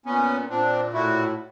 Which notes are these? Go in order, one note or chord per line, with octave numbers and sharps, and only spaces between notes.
A#2 B3 C#4
A#2 C4 D4
A2 E4 F#4